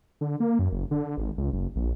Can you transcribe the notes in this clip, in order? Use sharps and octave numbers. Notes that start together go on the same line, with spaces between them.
D3
A#3
F#2
F#1
D3
G#1
C#2
F#1
A#1